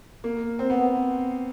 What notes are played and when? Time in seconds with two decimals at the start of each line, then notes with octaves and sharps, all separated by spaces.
0.24 A#3
0.59 C4
0.70 B3